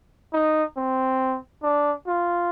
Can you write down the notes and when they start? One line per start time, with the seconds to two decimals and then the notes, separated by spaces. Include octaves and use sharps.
0.33 D#4
0.77 C4
1.63 D4
2.07 F4